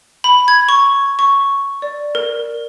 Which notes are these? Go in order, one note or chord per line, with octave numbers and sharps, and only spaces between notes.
B5
G#6
C#6
C#6
D5
A#4